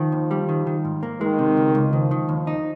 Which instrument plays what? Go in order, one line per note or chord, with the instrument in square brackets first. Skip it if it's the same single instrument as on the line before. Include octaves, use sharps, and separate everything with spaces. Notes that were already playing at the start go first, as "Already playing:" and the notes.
Already playing: [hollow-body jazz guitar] D#3 [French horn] F3
[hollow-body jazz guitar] D#2
G3
D#3
D#3
G#2
A#3
[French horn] D#3 [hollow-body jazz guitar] G#3
[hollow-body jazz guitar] C3
C#2
C#2
[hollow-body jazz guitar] D#3 [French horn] F3
[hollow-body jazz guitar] D#3
D#2
D#4